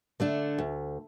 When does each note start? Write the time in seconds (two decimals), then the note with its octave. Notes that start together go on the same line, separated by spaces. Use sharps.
0.20 D3 A3 D4
0.58 D2